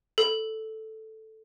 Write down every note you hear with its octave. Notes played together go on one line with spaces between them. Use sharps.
A4